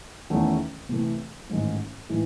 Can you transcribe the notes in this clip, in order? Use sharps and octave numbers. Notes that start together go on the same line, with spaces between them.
E2 D#3 A3 C#4 G#4
C3 E3 A3
A1 G#2 D#3 G#3 D#4
A2 E3 G#3 D#4